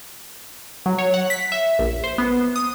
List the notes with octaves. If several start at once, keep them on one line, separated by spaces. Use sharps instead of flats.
F#3
C#5
F#5
B6
E5
A#1
C5
B3
D#6